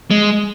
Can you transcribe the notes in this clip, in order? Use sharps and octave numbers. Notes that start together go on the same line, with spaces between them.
G#3